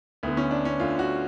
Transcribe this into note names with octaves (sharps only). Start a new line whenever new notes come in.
D2 D3 B3
C#4
D4
C#4
D2 D3 F4
F#4